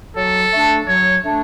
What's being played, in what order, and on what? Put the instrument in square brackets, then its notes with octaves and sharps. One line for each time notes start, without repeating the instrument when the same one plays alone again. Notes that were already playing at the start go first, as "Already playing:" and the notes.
[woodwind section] F#3 [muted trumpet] A4
[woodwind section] A3 D4
[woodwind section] F#3 [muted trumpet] C#5
[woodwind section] A3 D4